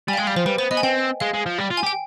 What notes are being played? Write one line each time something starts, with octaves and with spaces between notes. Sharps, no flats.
G3 G#5
F5
G#3 G5
G3 F5
F3 C5
G3 B4
B3 C5
B3 D#5
G#5
C4 G5
G#3 F5
G#3
F3
G3
F4
G#5
G4
G5